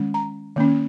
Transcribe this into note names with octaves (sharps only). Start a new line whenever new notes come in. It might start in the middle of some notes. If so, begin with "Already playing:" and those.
Already playing: D#3 G#3 C#4
A#5
D#3 A#3 C#4